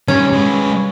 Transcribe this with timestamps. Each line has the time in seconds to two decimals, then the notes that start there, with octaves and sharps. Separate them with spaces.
0.08 D#3 G3 C#4
0.32 G#3 B4